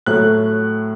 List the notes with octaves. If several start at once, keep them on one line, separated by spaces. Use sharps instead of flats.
A2 F#3 A3 F#6